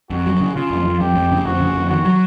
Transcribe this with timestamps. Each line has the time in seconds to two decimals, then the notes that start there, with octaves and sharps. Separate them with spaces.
0.10 F2 F#4
0.26 F#3
0.40 C#3
0.55 C#3 F4
0.71 F2
0.85 F2
1.00 F2 G4
1.15 F2
1.31 C#3
1.45 F2 F#4
1.60 C#3
1.75 F2
1.90 D#3 F#4
2.05 F#3